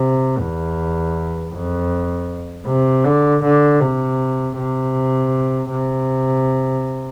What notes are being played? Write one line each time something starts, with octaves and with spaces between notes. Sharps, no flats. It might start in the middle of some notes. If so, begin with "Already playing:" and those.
Already playing: C3
E2
F2
C3
D3
D3
C3
C3
C3